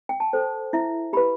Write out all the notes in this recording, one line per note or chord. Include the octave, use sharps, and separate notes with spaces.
G5
A5
A4 C5
E4 E5
G4 B4 B5